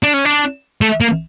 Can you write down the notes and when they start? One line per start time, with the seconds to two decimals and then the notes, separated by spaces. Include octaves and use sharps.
0.03 D4
0.14 C#4
0.25 D4
0.81 A3
1.01 A#3